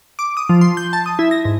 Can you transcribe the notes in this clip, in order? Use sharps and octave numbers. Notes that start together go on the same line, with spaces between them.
D6
D#6
F3
C6
G6
A5
D#6
E4
A#6
G#2